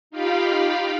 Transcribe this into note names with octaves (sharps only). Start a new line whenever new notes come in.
D#4 F4 G4 F5 G5 B5